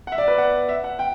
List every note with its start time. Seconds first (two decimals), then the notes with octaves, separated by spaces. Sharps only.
0.07 F#5
0.12 E5
0.18 D5
0.28 B4
0.38 F#5
0.69 E5
0.84 F#5
0.99 G5